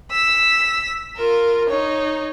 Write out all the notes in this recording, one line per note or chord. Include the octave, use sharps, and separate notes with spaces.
E6 B6
F4 A#4
D#4 C#5